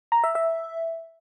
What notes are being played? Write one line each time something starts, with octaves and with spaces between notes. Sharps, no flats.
A#5
E5
E5